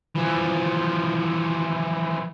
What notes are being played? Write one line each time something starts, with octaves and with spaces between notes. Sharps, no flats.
E3 F3